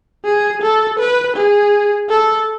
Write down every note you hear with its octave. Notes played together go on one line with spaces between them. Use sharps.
G#4
A4
B4
G#4
A4